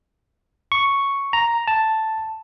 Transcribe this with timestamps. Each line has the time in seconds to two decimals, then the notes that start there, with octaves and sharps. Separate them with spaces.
0.72 C#6
1.33 A#5
1.67 A5